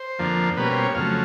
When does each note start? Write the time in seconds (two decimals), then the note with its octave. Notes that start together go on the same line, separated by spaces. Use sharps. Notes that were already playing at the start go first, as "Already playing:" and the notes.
Already playing: C5
0.19 F2 D3 F3 A#3
0.57 B2 G3 A#3 C#4 B4
0.70 C5
0.82 C#5
0.95 F2 C#3 F#3 A3 F5